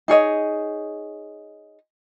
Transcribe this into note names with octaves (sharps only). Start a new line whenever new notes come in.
D#4 G#4 C#5 D#5